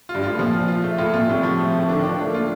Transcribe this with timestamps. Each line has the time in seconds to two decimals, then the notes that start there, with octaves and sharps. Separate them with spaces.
0.09 F4
0.15 G2
0.24 A2 F4
0.39 A#2 F3
0.54 F4
0.68 F4
0.84 A3
0.98 A2 F4
1.14 A#2 F4
1.28 A2 C3
1.43 F3
1.58 A3
1.74 A2
1.89 D3 D4
1.99 D#3
2.03 D4
2.09 F3
2.19 A3 D4
2.29 A#3
2.34 A3 F4